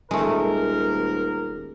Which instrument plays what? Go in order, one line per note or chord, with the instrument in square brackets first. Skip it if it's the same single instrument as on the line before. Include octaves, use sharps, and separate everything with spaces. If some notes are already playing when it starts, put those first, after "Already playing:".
[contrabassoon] D#1 [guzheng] G#3 A3 [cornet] A#4